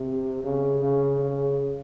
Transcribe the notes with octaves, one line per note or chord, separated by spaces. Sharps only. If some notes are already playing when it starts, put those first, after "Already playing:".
Already playing: C3
C#3
C#3
C#3